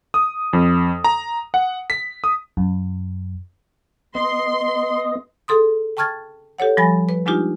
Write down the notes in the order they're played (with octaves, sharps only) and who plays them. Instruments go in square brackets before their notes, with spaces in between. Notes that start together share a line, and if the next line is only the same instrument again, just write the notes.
[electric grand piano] D#6
F2
A#5
F#5
B6
D#6
[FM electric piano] F#2
[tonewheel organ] B3 D#5 [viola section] C6
[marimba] G#4 A4 C6 D#6
G5 A5 C#6 F6 G#6 A6
G4 A4 C#5 F#5
F3 G3 G#5 B5 A6 A#6
B4
G3 G#3 D4 D#4 F4 G4